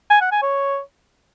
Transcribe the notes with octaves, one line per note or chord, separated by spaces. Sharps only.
G#5
F#5
G#5
C#5